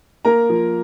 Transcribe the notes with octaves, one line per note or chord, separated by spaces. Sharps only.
A#3 A#4 A#5
F3